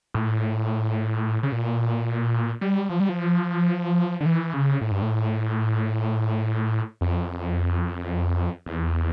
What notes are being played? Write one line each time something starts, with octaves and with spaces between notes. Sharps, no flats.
A2
C#3
A#2
G3
F3
G3
F3
D3
E3
C#3
A2
G2
A2
F2
E2